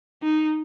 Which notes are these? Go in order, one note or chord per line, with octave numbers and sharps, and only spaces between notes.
D#4